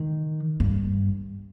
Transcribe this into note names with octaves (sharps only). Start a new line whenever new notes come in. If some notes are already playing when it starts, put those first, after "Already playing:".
Already playing: D#3
G2